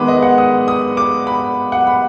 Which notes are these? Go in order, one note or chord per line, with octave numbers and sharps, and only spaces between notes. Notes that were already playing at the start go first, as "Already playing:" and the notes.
Already playing: D#3 G#3 B3 B5 D6
D#5
F#5
D#6
D#6
D6
B5
F#5
B5